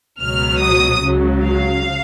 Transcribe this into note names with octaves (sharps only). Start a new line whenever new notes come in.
C#2 B2 F#3 F6
D#6
C#2 C#3 F#3
F5